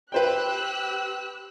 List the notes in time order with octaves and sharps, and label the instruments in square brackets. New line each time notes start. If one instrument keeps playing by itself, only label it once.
[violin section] G4 E6 F#6 [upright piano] B4 C5 G5